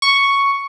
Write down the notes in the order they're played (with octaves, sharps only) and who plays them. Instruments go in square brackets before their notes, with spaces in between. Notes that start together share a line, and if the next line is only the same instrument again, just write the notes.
[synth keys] C#6